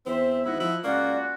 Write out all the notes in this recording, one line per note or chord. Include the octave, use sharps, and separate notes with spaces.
E2 C4 C5 E5
G#1 E4 D#5 E5 F#5
F3 E4
C#2 A#3 C#4 F4 F#4 D5